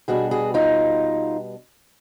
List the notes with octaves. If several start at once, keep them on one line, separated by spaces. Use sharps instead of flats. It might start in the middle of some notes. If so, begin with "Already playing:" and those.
B2 G3 B3 D4 F#4 G#4
F#4 G#4
D#4 F4